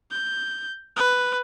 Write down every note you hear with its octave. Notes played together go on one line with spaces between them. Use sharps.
G6
B4